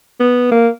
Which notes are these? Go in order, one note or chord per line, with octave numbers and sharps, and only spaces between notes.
B3
A#3